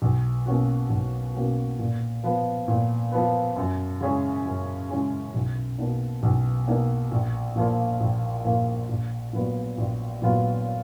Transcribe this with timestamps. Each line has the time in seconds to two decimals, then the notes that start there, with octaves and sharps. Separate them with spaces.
0.02 B1
0.46 B2 A#3 C#4 F#4
0.90 B1
1.35 B2 A#3 C#4 F#4
1.79 A#2
2.24 F3 B3
2.68 A#2
3.12 F3 B3
3.56 F#2
4.01 C#3 G#3 C#4 G#4
4.45 F#2
4.90 C#3 G#3 C#4 G#4
5.34 B1
5.78 B2 A#3 D#4
6.23 B1
6.67 B2 A#3 D#4
7.11 A#1
7.56 A#2 F3 A#3 F4
8.00 A#1
8.44 A#2 F3 A#3 F4
8.89 A#1
9.33 A#2 F#3 B3 F4
9.78 A#1
10.22 A#2 F#3 B3 F4